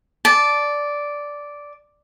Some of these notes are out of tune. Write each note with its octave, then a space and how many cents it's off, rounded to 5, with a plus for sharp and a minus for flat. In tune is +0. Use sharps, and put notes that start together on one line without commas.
D5 -5 A5 -15